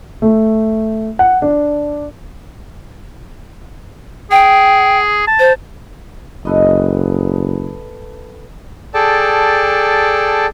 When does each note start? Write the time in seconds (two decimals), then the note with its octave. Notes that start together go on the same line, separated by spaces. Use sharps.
0.22 A3
1.19 F#5
1.42 D4
4.31 G#4 G5
5.27 A5
5.39 C5
6.45 F#1 A4 B4 D#5
8.94 G#4 A4 D5 G5 A5